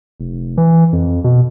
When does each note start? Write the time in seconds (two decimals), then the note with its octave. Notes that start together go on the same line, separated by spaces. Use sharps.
0.20 F1
0.57 E3
0.93 F2
1.24 B2